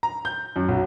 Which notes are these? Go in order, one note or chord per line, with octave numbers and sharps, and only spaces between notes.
A#5
G6
F#2
B1